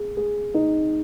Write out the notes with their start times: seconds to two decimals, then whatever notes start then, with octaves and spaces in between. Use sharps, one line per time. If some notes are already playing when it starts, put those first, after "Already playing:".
Already playing: G#4
0.17 G#4
0.54 D#4